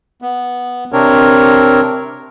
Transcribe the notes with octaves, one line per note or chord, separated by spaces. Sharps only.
B3
C3 C4 D4 A#4 C#5